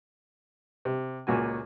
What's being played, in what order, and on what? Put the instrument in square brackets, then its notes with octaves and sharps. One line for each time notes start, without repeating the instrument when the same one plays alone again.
[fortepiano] C3
C#2 A#2 F#4 G#5